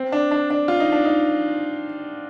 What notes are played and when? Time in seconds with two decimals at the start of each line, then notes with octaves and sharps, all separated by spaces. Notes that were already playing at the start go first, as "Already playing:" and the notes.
Already playing: C4
0.12 D4
0.31 D4
0.50 D4
0.68 F4
0.80 D#4
0.92 D4
1.05 D#4